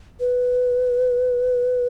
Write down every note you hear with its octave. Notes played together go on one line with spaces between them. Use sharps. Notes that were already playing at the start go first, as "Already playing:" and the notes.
B4